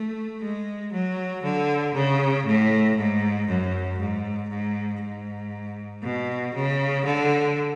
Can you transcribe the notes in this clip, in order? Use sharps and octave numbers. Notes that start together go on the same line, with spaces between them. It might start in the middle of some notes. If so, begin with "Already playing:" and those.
Already playing: A3
G#3
F#3
D3
C#3
A2
G#2
F#2
G#2
G#2
G#2
B2
C#3
D3